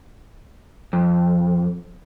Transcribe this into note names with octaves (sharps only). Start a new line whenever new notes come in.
F2